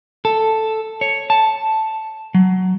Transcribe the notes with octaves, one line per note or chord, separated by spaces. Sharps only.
A4
C#5
A5
F#3